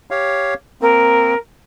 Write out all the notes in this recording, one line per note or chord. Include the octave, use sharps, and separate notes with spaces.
G4 C#5 F5
A#3 C4 A#4